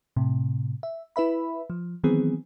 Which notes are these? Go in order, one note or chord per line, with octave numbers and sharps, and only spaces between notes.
A2 C3
E5
E4 B4 E5 B5
F3
D#3 E3 F#3 B3 C4 G#4